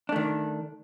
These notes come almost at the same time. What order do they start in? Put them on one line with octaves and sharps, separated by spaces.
D4 A3 D#3